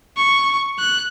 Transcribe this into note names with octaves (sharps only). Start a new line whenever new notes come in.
C#6
F#6